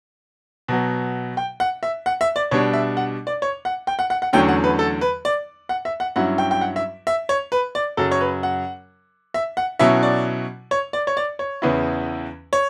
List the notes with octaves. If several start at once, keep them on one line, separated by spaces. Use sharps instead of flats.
B2 F#3 B3
G5
F#5
E5
F#5
E5
D5
B2 G3 D4 C#5
E5
F#5
D5
C#5
F#5
G5
F#5
F#5
F#5
E2 D3 F#3 A3 C#4 G5
F#5
B4
A4
B4
D5
F#5
E5
F#5
G2 F#3 C#4 E4 F#5
G5
G5
F#5
E5
E5
C#5
B4
D5
F#2 C#3 F#3 A4
C#5
B4
F#5
E5
F#5
B2 F#3 C#4 E4 E5
D5
C#5
D5
C#5
D5
C#5
E2 C#3 E3 B3 E4
C#5